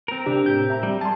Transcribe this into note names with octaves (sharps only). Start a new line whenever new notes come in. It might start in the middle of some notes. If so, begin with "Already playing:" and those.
C4 A#4
C3 D4 G4
A2 G4 G6
E5 A#5
G3
G#4 A5 C6